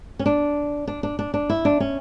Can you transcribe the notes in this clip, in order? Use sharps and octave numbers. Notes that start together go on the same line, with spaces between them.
C#4
D4
D4
D4
D4
D4
E4
D4
C#4